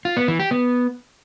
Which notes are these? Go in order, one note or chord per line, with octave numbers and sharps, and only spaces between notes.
F4
B3
E3
G4
B3